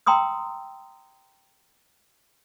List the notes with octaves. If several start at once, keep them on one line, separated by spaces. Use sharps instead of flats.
G5 A#5 C6 D#6 E6